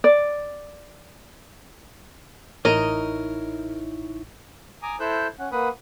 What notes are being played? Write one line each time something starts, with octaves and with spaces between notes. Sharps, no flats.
D5
A1 D#4 E4 A#4 C#5 D#5 A#5
G#5 A#5 D6 D#6
E4 A4 C5 E6 F#6 G6
C#4 F#5
A#3 B4 F#5 B5 D#6